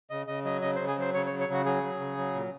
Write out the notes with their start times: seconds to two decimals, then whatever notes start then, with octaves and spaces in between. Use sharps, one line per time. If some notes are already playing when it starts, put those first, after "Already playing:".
0.10 C#3 D#5
0.27 C#3 D#5
0.45 F#3 D#5
0.62 C#3 D#5
0.76 C5
0.80 C#3
0.88 G#4
0.97 F#3 C5
1.14 C#3 C#5
1.26 C#5
1.31 F#3
1.40 C#5
1.49 C#3 F#4
1.65 F#3 G#4
1.83 F#3
2.00 C#3
2.17 F#3
2.35 A#2